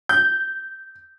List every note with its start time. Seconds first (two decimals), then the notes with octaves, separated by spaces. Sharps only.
0.09 G6